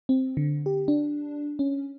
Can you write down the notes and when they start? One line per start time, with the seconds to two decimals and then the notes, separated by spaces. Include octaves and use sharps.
0.09 C4
0.37 D3
0.66 G4
0.88 D4
1.59 C#4